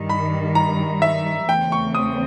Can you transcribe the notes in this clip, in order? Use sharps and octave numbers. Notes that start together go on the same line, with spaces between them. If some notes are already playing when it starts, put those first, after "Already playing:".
Already playing: G2 D#3 G3
B5
A#5
E5
E2 C#3 E3 A3 C4 G5
C#6
D#6